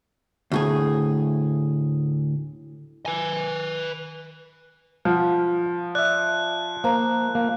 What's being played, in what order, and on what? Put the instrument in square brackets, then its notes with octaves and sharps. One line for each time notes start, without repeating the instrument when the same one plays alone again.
[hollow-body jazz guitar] D2 A2 G#4
[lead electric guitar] B4 G#5
[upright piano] F3 [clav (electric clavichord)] F5 F#5
[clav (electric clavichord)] D5 E5 [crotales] F#6
[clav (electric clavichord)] A#3 [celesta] C5 A#5
[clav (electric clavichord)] A#3